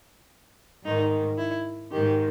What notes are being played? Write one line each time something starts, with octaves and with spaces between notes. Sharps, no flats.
G#2 D#3 D#4
E4
G#2 D#3 G4